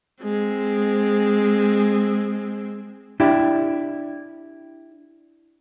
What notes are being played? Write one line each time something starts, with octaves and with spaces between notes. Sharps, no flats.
G#3 C4
D4 E4 G4